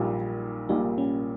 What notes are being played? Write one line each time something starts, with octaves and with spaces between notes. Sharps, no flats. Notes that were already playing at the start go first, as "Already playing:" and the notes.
Already playing: A#1 A#2 G3 D#4
A#1 A#2 G3 D#4
C#4